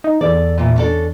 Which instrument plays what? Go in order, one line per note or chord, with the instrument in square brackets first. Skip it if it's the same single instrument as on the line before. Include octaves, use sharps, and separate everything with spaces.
[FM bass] D#4
[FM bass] E2 [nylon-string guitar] A4 D5
[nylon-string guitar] A#2 E3
C#4 D4 A4